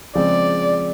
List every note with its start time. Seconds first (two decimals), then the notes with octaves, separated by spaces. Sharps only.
0.15 C#3 F3 G#3 C4 F4 D5